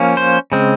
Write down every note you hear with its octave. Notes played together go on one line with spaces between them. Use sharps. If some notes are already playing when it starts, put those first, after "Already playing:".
Already playing: F3 A#3 C#4
C5
C#3 G#3 C4